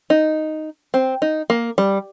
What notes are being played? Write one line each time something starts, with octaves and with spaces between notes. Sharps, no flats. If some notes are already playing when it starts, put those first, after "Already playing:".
D#4
C4
D#4
A#3
G3